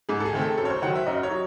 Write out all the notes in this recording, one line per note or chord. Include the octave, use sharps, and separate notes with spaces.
G#2 G#4
A4
G#4
D#3 A3 C4
A4
F#2 A4
C#5
C5
D#3 F#3 F#5
E5
F#2 D#5
C#5
F#3